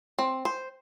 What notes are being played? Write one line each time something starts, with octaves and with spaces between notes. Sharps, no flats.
C4
C5